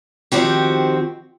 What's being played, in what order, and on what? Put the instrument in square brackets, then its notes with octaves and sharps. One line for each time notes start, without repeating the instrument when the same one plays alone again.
[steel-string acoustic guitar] D#3 F3 C4 F#4 G4